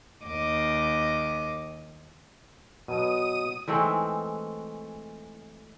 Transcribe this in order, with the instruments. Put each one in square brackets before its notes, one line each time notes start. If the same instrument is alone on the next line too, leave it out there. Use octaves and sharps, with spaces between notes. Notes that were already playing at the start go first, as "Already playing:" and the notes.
[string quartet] D#2 D#5 D6
[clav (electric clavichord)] B2 F#3 [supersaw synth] D#6 D#7
[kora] E3 G#3 A3 C4